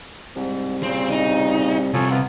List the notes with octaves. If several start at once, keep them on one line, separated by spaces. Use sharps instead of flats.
C2 G#2
A#2 C#3 C4
D#4
C2 C3 F3 A4 C#5 G#5
F2 B3 F4